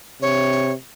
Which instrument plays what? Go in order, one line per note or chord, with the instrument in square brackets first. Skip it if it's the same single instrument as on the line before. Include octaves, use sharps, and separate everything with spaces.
[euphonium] C3 [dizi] C#5